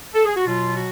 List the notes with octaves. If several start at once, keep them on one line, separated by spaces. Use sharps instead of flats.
A4
G#4
F#4
B2 F#3 F4
F#4